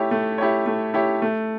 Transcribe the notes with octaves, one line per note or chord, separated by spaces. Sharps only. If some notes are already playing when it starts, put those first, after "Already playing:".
Already playing: A3 E4 G4 C#5
A3
E4 G4 C#5
A3
E4 G4 C#5
A3